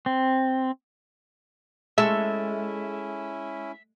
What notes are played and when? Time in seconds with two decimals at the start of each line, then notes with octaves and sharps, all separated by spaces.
0.06 C4
1.98 G#3 C#4 E4 A4 E5 C#6